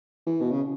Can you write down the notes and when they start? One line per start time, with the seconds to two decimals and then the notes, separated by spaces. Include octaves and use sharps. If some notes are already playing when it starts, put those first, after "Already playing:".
0.26 E3
0.41 B2
0.51 C#3